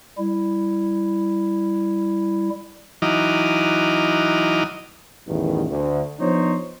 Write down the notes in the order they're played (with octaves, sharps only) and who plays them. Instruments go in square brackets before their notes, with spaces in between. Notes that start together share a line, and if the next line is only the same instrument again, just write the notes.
[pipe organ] G3 E4
[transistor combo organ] E3 F#3 D#4 D#5 D6 F6
[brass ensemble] A1 E2 G2 B2 D#3
D2
F3 B3 D4 D#4 C5 C#5